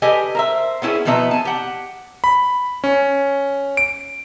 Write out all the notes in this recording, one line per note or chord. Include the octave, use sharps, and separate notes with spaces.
G4 A4 B4 D#5 G#5
A#4 C5 E5
B3 C#4 E4 G4 G#4
B2 E3 F3 B3 D#4 E5
G#5 A5
G4 F#5
B5
C#4
D7